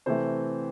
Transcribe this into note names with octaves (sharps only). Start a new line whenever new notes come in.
C3 E3 A3 C5